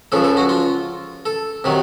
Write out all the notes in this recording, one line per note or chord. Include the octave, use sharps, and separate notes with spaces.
C#2 C#3 F3 A4
A4
F#4
F4
A4
C3 D#3 F#3